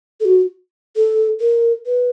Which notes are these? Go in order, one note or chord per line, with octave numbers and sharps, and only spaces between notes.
A4
F#4
A4
A#4
B4